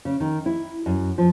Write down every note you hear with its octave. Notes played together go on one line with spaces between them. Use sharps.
C#3
D#3
E4
F#2
F3